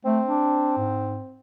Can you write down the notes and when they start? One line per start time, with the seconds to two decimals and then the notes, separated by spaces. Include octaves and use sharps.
0.05 A3 C4
0.26 D4
0.77 G#2